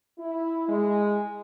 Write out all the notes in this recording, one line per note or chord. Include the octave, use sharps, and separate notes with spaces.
E4
G#3